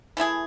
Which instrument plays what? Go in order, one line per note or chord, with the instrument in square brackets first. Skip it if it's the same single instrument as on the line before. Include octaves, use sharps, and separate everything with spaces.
[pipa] E3 A3 E4 G#4